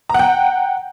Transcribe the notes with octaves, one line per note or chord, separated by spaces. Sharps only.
F#5 G5 A#5